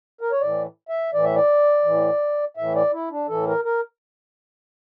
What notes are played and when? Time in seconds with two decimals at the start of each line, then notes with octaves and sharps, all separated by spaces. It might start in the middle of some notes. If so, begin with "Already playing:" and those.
0.21 A#4
0.31 C#5
0.41 A2 E3 D5
0.89 E5
1.14 A2 E3 D5
1.24 E5
1.36 D5
1.85 A2 E3
2.57 A2 E3 E5
2.75 D5
2.93 E4
3.11 D4
3.28 A2 E3 A4
3.47 A#4
3.65 A#4